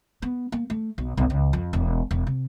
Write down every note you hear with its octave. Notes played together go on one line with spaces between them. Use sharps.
B3
A#3
A3
B1
B1
C#2
F2
E1
E1
C3